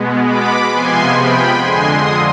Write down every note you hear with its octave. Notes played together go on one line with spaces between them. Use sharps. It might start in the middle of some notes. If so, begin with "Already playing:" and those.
Already playing: B2 G#3 B3
B5 D6
C3 F3 G#3 B3 G#5 C6
G5 B5
F2 D3 G#3 G#5 C6
C6 D#6